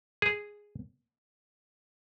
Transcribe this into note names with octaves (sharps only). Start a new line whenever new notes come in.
G#4